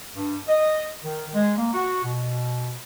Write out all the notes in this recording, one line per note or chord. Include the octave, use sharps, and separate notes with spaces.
G2
D#5
D#3
G#3
A#3
F#4
B2